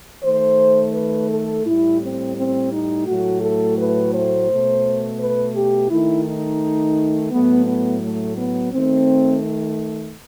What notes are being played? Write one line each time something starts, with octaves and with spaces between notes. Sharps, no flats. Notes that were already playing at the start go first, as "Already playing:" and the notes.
D#3 A3 C5
B4
A4
A2 G3 E4
C4
C4
D#4
A2 F#3 A3 F#4
A4
B4
C5
B2 A3
B4
G4
D#3 A3 E4
D#4
A2 F#3 A3 B3
B3
A3
B3
D#3 A3 C4